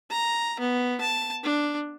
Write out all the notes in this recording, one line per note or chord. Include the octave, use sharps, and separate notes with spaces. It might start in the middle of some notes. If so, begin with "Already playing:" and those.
A#5
B3
A5
D4